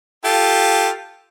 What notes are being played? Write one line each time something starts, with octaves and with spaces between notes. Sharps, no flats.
F4 G4 A4